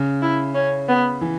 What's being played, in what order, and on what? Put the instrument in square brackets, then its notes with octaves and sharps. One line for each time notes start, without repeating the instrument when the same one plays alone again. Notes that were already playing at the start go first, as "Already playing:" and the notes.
Already playing: [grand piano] C#3
[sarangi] E4
C#4
B3
[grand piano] E3